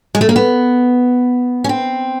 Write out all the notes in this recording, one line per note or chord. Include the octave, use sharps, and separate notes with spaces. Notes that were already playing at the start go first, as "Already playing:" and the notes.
G#3
A3
A#3
B3
C#4
C4